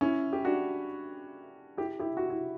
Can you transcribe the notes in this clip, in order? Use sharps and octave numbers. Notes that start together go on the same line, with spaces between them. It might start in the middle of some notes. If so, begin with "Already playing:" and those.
C#4 E4
G4
D4 F#4
E4 G4
E4 G4
F#4
E4